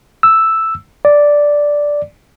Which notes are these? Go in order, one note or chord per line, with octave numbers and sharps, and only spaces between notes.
E6
D5